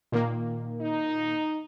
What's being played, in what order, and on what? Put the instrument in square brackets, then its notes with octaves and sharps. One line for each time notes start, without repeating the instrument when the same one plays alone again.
[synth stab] A#2 D#3 A#3
[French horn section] D#4